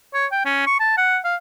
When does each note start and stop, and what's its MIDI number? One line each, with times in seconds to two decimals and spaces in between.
0.14 0.26 73
0.32 0.44 79
0.45 0.62 61
0.67 0.76 85
0.80 0.94 81
0.97 1.18 78
1.24 1.36 77